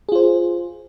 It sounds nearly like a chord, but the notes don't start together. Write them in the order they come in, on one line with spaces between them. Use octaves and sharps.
G#4 F4 C5